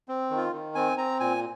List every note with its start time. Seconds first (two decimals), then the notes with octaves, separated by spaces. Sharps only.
0.08 C4
0.30 D#3
0.37 F4
0.53 D#3
0.75 C4 G#5
0.97 C4 A#5
1.20 A#2 G#5